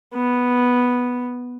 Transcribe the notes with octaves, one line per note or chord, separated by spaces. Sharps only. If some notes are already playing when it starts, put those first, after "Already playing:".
B3